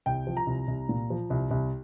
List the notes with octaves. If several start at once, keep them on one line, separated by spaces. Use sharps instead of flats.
C2 G5
F3
A#5
C2
C2
A#2
F3
C2
C2